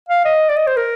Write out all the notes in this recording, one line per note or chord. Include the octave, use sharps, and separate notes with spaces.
F5
D#5
D5
D#5
C5
A#4